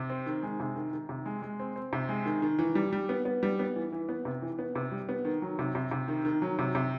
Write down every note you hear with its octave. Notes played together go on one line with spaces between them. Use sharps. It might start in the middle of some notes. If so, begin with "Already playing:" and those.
Already playing: C3
C4
D#3
G#3
C3
D#3
D#3
C3
G#3
G#3
C4
C4
C3
G#3
D#3
D#3
E3
G3
G3
B3
B3
G3
B3
E3
E3
B3
C3
E3
B3
C3
G3
B3
D#3
F#3
C3
C3
C3
D#3
D#3
F#3
C3
C3